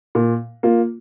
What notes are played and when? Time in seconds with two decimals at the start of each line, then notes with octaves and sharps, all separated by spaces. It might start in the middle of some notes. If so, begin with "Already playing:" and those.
0.15 A#2
0.63 A#3 F4